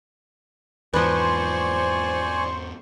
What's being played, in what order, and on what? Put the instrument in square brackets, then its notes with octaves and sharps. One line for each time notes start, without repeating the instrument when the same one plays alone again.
[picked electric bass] E2 G#2 [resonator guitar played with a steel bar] F3 B4 [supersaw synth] C5 C#6 [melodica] D5 G#5